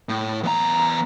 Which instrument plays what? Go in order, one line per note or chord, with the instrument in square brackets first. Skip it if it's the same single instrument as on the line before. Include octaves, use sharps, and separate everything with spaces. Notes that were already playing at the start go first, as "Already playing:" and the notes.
[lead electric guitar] A2
E2 A#5